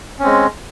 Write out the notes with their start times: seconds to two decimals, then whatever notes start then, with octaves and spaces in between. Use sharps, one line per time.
0.19 C#4
0.23 C4
0.26 G#3